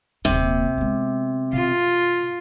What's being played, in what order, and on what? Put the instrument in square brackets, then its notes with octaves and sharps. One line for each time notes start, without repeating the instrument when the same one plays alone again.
[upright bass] D#1 A#3 [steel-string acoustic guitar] C3
[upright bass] G#3 B3
[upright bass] B2 [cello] F4